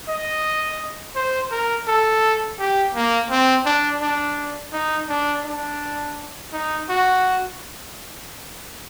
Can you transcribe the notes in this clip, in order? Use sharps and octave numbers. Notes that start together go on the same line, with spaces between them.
D#5
C5
A#4
A4
G4
A#3
C4
D4
D4
D#4
D4
D4
D#4
F#4